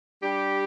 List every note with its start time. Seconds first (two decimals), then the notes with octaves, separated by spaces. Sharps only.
0.22 G3 D4 G4